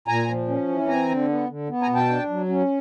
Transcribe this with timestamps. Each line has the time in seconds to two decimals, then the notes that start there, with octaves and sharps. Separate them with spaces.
0.08 A#2 G#5 A#5
0.28 F3
0.48 C#4
0.68 E3
0.88 C4 G#5 A#5
1.09 D3
1.28 B3
1.49 D3
1.69 B3
1.82 G#5 A#5
1.88 B2
1.95 G5 A5
2.09 D4
2.29 F#3
2.49 C#4